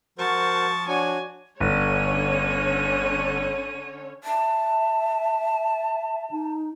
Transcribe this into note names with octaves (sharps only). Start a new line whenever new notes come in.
F3 F#4 A#4 C5 A5 C#6
D4 F#4 C#5 G#5
G1 D3 C#4 C#5 D#7
E5 A5
D#4